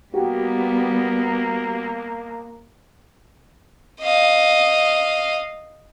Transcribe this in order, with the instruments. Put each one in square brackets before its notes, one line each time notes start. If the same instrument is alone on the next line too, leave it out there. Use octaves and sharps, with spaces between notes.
[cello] G3 B3 [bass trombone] A#3 [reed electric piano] F#4 G4
[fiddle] D#5 F5